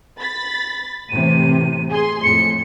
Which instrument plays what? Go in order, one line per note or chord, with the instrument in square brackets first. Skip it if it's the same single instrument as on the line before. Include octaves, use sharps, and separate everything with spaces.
[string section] B5 A6 B6
[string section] A2 C3 E3 [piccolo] D#7
[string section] G#4 C6
[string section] F2 A2 [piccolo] C#7